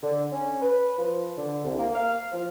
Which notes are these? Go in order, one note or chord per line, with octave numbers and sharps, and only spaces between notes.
D3
C#4
B4
F3
D3
C2
A#3
F5
F3